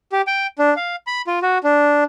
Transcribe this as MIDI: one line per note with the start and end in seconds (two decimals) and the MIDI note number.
0.12 0.22 67
0.27 0.47 79
0.58 0.74 62
0.76 0.96 77
1.07 1.22 83
1.27 1.39 65
1.42 1.58 66
1.64 2.04 62